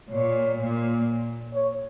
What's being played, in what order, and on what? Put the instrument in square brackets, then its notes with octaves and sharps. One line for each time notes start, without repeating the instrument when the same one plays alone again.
[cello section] A#2 [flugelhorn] C#5
[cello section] A#2
[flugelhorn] C#5